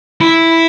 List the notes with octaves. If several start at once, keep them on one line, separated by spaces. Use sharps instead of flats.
E4